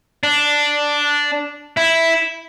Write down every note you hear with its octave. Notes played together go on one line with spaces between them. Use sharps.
D4
E4